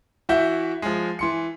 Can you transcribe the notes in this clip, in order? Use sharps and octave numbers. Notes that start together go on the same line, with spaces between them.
E3 E4 F#4 E5 G6
F3 G#3
E3 C6 C#7